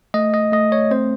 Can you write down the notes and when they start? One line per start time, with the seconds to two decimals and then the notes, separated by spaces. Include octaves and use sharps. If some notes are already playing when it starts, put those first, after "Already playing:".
0.14 A3 D#5
0.34 D#5
0.52 A3 D#5
0.72 C#5
0.91 C4 C5